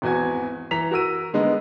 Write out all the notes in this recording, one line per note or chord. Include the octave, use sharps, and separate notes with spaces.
G#1 E2 F#4 G#5 G#6
E3 A#5 B6 F7
F#4 A#4 E6 D#7
D3 G#3 B3 D#4